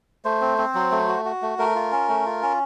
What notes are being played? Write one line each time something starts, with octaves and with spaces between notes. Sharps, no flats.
A3 C5
C4
C4
F#3
A3
F#4
F#4
A3
A3 A#4
F4
C#4
A3
F4
C#4